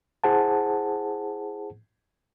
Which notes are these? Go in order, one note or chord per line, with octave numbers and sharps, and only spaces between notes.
E4 G#4 C5 F#5 A5